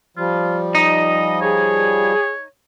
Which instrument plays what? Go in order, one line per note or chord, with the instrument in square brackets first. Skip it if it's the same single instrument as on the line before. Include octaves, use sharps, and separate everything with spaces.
[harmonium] F3 G3 [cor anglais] F4
[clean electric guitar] D#4 [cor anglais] D#5
[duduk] G#4 [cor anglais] C#5